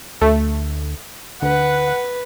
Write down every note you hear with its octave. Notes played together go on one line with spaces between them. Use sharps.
D2 A3
D2 B4 F#5